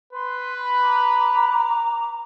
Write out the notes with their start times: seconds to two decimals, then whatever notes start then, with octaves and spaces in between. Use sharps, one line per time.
0.13 B4 C6
0.81 A#5 D6